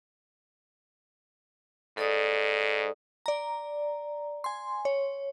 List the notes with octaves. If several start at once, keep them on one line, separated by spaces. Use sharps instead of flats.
G#2 A4 D5 D#6
D5 A#5
G#5 C6
C#5